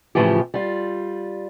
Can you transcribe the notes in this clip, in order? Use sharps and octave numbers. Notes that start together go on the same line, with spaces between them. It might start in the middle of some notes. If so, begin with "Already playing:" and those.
A2 C#3 E3 F3 F4 G4
G3 F4